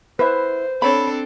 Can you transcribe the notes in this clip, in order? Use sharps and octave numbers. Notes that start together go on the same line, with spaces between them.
E4 B4 C5 E5
C4 D4 A4 C#5 B5